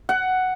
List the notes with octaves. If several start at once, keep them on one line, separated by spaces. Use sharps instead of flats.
F#5